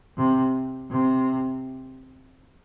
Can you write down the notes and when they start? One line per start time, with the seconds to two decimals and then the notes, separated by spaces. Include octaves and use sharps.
0.17 C3
0.91 C3